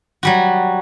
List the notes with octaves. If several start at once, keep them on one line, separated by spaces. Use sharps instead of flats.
F#3 G3 F#4